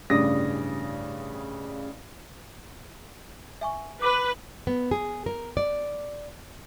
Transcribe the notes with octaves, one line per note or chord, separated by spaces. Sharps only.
A1 G2 C#3 D5 D#6 A#6
E5 G#5 C#6
B4 D6
B3
G#4
A#4
D5